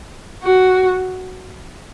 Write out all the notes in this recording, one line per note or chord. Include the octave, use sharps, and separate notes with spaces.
F#4